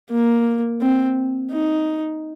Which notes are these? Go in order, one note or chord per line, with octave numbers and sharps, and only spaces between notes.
A#3
C4
D#4